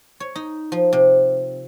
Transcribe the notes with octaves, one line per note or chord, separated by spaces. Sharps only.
C#5
D#4
F3
C3